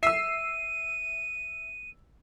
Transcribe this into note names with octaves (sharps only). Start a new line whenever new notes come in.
E5 E6 C7 D#7